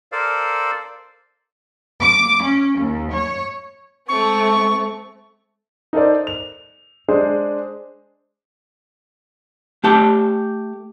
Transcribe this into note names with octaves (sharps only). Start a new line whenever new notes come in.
A4 A#4 C5 D5 F5
D6
C#4
D#2
C#5
G#3 A3 C4 C#6
D#4 A4 A#4 C5 D5
F7
G#3 D4 G#4 C5
A3 G4 A5